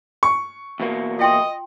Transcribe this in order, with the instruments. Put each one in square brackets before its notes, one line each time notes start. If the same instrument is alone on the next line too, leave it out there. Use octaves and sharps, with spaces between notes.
[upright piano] C#6
[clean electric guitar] E2 B2 A#3
[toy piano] F4 G5 C6 [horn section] D#5